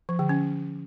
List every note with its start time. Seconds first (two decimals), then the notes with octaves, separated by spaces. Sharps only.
0.09 F3
0.19 D3
0.29 C#4